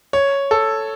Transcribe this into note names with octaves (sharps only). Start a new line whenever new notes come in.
C#5
A4